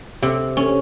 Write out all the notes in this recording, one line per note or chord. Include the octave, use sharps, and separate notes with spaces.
C3
C#4